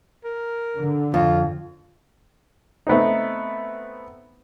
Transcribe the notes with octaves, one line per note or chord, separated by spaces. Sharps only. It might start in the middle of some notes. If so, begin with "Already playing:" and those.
A#4
D3
F2 F4
A3 B3 C4 D#4